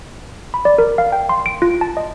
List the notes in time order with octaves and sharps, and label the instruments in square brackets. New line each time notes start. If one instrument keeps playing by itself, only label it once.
[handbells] B5
D5
A#4
F5
G5
C6
D7
F4
A5
D#5